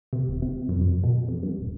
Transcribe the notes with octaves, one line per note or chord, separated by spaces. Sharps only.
C3
E1
C3
F#2
F#2
B2
F2
G2
D#1